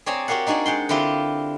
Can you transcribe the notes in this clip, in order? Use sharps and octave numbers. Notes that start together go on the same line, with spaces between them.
C4 G#4 C#5 D5 A5 A#5
F#4 G4 A#4 F5 F#5
D4 D#4 F#4 G#4 D5
G#3 F#5 G5 C6
D3 C4 E4 F4 G4